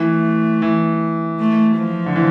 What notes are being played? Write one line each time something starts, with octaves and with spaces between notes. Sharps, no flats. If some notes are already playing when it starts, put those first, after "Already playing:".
Already playing: E3 A3
E3
A3
F3
D3
E3